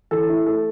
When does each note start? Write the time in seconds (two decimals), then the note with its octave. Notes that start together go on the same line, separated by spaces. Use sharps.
0.11 E3 A4
0.29 E4
0.46 A3 A4